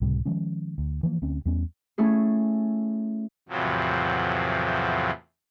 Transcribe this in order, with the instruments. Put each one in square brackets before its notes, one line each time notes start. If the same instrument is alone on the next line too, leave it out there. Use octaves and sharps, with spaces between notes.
[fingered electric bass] C#2 A2 C3 G3
D#3 F3 G#3 C#4
D2
E3 F3 A#3
D2 C4 C#4
E2 G3 B3 C#4
[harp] A3 C#4 E4 G#4
[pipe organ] E2 A2 C3 F3 F#3